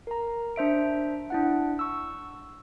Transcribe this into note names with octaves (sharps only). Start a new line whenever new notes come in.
A#4 A#5
D4 C5 E5 D7
D4 E4 F#5
C#6 E6